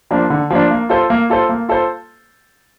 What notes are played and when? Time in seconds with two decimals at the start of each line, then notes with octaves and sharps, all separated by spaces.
0.11 F3 A#3 D4
0.30 D3
0.50 F3 A#3 D4
0.71 A#3
0.89 F4 A4 C5
1.10 A#3
1.30 F4 A4 C5
1.49 A#3
1.69 F4 A4 C5